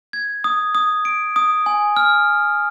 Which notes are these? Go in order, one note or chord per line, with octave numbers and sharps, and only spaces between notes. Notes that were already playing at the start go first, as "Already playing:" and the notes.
G#6
D#6
D#6
D7
D#6
G#5
F6